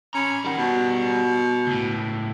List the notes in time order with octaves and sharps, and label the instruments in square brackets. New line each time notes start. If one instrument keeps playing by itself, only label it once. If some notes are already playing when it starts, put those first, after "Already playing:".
[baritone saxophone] C#4 [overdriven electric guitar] A#5 B5
[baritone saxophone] D#3 [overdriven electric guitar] G3 F#5
[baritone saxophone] B2
[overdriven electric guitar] C#2 A2